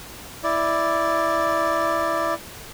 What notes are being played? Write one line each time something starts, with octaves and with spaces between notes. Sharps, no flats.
E4 D5